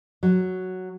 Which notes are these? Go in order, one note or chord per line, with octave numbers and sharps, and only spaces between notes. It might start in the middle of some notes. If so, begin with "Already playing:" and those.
F#3